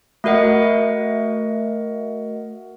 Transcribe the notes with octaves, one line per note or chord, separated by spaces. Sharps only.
A3 F#4 A#4 D#5 F#5